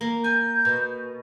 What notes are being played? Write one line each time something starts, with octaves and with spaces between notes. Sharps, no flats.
A#3
G#5 G6
B2